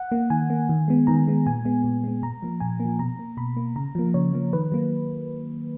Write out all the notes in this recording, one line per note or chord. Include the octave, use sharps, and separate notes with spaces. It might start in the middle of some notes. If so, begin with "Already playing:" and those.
Already playing: F#5
A#3
D#3 G#5
A#3
D#3
G#3 B3
D#3 A#5
G#3 B3
A#2 G#5
G#3 B3
A#2
G#3 B3
A#2 A#5
F3 A#3
A#2 G#5
A#3
F3
B2 A#5
A#3
B2 B5
A#3
C#3 A#5
F3 A#3
C#3 C#5
F3 A#3
D#3 B4
F#3 A#3